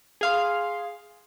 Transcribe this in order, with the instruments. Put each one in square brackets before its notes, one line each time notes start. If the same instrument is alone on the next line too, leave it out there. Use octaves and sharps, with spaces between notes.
[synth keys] G#4 F5 C6